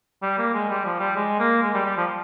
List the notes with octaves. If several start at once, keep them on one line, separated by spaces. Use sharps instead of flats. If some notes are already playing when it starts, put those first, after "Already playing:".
G3
A#3
G#3
G3
F3
G3
G#3
A#3
G#3
G3
G3
F3